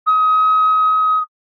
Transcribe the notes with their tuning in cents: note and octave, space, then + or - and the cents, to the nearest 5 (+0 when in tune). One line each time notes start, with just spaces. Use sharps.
D#6 +30